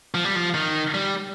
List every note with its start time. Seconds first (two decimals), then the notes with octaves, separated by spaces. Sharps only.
0.14 F3
0.24 G3
0.35 F3
0.54 D#3
0.94 G3